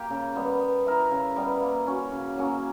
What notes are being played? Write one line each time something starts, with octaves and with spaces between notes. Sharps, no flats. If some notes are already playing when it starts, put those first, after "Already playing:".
Already playing: A#3 G4
C#3
G3 B3
B3
E4 A#4 E5
C#3
G3 B3
A#3
C#4 F#4
C#3
F#3 A#3 C#4